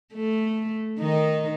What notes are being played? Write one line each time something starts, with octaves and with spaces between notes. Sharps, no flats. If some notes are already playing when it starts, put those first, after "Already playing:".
A3
D#3 D#4